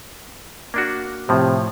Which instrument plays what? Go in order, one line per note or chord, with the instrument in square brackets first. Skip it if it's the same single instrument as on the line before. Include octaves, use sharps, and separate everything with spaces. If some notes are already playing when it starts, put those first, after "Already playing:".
[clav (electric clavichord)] A#3 D4 F#4
[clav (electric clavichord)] A2 F3 [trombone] C3